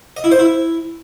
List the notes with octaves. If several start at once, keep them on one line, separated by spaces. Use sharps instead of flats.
D#5
E4
C5
E4